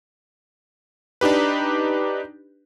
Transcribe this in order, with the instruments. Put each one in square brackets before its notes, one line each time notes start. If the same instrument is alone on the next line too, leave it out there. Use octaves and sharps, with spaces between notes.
[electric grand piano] D4 D#4 G4 B4